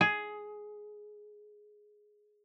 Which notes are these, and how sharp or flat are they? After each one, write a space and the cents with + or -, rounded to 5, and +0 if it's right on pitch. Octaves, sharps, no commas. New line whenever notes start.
G#4 +10